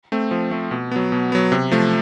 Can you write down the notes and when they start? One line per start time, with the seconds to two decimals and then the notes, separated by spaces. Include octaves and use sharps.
0.12 A3 C4
0.31 F3
0.51 A3 C4
0.71 B2
0.92 F#3 B3
1.12 B2
1.32 F#3 B3
1.52 C3
1.71 F3 A3